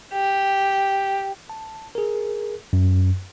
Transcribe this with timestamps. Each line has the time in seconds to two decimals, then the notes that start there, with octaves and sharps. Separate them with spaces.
0.12 G4
1.50 A5
1.95 G#4 A#4
2.73 F#2